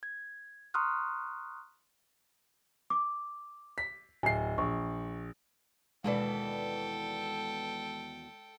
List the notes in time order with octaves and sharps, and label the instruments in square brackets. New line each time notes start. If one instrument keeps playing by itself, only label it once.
[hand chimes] G#6
A#5 C6 C#6 D#6 F6 F#6
[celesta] D6
[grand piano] B6
[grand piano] D1 C7 [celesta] G#5
[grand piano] A#1 [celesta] C#6
[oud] D#2 B2 E3 [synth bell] G#3 D5 [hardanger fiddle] A4 G5